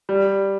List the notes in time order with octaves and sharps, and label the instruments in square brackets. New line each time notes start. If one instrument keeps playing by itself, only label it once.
[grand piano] G3